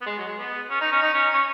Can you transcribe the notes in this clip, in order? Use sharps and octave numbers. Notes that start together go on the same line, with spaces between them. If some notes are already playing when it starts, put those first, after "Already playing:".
B3
G#3
F#3
G#3
B3
C#4
D#4
C#4
D#4
C#4
C#4